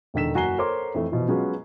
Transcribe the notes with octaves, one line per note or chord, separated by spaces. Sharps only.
E1 D3 D#3 A4 B6 E7
F#1 F#4 G#5 A#5 C7 G7
A4 A#4 C5 C#5 C6 D6
F2 E3 A3
B2 E3 F3
F#3 G#3 B3 C#4 F4 F#4